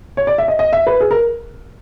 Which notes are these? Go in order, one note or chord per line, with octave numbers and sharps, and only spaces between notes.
C#5
D5
E5
D#5
D#5
E5
B4
G#4
A#4